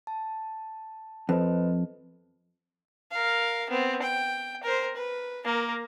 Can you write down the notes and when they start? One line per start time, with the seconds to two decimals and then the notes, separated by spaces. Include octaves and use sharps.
0.07 A5
1.29 F2 B4 C5 D#5
3.11 A#4 F5
3.70 B3 C4
4.02 G5
4.63 A#4 C5
4.96 B4
5.44 A#3 A#4